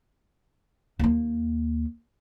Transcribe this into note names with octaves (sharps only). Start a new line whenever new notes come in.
D#2 A#3